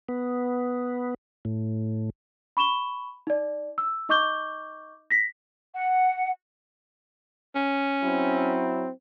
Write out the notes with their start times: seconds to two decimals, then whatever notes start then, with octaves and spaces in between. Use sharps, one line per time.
0.09 B3
1.45 A2
2.57 B5 C#6 E7 G7
3.27 D#4 D5
3.78 E6
4.09 D#4 D#5 C#6 D6 G6 G7
5.10 A#6 B6
5.74 F#5
7.55 C#4
8.04 F#3 C4 E4